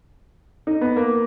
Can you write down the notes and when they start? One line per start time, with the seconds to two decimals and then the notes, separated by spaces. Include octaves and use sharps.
0.67 D#4
0.81 B3
0.96 A#3